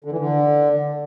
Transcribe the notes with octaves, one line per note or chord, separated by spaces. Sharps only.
D3
E3
D3